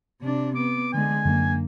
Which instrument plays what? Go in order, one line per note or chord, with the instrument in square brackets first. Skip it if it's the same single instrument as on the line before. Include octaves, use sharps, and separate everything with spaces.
[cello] C3 D4
[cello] B3 [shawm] D6
[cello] D3 G#3 [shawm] G#5
[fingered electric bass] F#2 D3 [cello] A#3